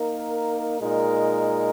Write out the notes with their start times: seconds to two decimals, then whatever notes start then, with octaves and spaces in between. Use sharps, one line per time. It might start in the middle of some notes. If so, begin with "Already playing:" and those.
Already playing: A#3 D#4 A#4
0.80 A#2 G#3 D#4 A#4